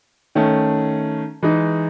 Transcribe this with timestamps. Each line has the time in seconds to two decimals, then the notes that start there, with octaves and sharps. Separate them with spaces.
0.35 D#3 A3 C#4
1.43 E3 G#3 D#4